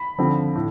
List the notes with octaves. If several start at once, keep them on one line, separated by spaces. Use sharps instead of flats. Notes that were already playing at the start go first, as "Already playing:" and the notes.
Already playing: B5
D3 F3 C4
A2